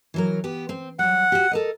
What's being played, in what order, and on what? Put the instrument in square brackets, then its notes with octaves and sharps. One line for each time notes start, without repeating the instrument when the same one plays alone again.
[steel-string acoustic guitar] E3 F#3 A#4
B3 G4
C4
[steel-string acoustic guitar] F#3 G3 [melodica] F#5
[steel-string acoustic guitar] F#4 G4
A4 A#4 D#5